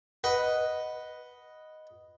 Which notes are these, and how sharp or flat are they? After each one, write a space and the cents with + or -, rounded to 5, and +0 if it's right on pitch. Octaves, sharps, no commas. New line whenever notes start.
B4 +0 D#5 +0 F#5 +0